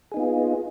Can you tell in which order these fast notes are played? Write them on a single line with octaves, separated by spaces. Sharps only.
G#4 D#4 B3 F4